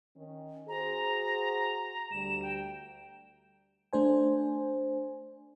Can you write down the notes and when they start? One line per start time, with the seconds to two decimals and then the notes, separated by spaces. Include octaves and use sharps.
0.16 D#3 C#4
0.69 F#4 G#4 C5 A#5
2.11 D2 G3 E7
2.42 G5
3.93 A3 D4 C5 G#5